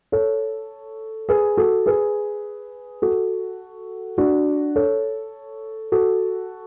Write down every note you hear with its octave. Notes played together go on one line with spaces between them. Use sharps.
A4 C#5
G#4 B4
F#4 A4
G#4 B4
F#4 A4
D4 F#4
A4 C#5
F#4 A4